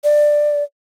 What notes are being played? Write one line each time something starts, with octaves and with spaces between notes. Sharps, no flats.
D5